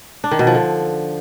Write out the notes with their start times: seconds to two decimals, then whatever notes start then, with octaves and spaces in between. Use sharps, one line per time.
0.24 D4
0.31 D#3
0.39 B2
0.47 F3
0.55 D3